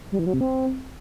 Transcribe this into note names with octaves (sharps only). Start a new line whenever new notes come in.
G3
E3
F#3
C3
C4